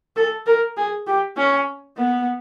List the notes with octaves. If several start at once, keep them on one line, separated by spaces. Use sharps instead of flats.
A4
A#4
G#4
G4
C#4
B3